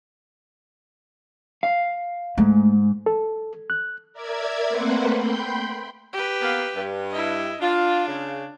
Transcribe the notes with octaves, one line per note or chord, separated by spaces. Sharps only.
F5
G#2 A3
A4
F#6
A#4 D5 E5 G#6
A3 A#3 C4 B4 C5 F#5
G5 B5 C6 G6
G4 B4
A#3 B3 F5
G2
E4 D#5
D4 F4
C#3